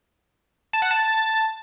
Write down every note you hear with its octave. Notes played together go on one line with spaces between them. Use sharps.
A5
F#5
A5